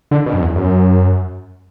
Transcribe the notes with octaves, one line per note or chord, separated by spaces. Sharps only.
D3
B2
F#2
E2
F#2